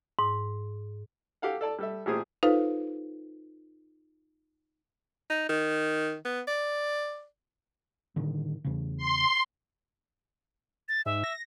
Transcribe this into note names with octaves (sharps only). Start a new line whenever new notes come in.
G#2
G4 A4 F5 F#5
A4 D5 A5
G3 A4 E5
A1 A#2 G4 G#4 C5 D#6
D#4 F4 A4 B4 C5 F5
D#4
D#3
B3
D5
A2 D3 D#3
E2 C#3
C6
A6
G#2 E5
A#6